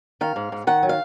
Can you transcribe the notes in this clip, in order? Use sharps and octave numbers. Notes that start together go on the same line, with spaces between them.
D#3 F5
G#2
G#2
D#3 F#5
F#3
F5